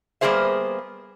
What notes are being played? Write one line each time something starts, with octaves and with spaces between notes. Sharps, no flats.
G3 A#3 B3 G#4 C5 E5